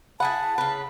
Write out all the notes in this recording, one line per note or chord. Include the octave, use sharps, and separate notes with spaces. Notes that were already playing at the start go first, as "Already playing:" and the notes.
E4 G#4 F#5 A5 B5
C#3 B4